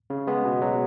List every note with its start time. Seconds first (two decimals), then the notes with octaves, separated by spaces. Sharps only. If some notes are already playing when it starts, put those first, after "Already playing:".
0.10 C#3
0.27 G#3 B3
0.45 B2
0.62 F#3